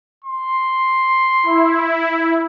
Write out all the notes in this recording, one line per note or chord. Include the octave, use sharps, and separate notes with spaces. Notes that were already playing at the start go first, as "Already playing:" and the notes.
C6
E4